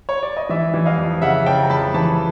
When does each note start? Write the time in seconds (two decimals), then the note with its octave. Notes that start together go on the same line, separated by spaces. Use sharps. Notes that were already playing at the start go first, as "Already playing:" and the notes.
0.09 C#5
0.23 D5
0.37 D#5
0.49 E3 D5 E5
0.74 E3
0.86 D#5 F5
0.98 F2
1.22 C#3 E5 F#5
1.46 C#3 G5 A5
1.63 A#5
1.70 F2 A5 B5
1.94 E3 A5 B5